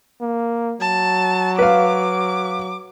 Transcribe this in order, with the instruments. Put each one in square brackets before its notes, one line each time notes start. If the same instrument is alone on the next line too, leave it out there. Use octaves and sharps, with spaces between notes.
[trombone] A#3
[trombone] F#3 [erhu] A5
[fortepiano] B4 F5 [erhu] D6